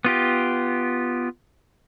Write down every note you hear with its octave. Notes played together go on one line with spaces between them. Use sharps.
B3 F4 G4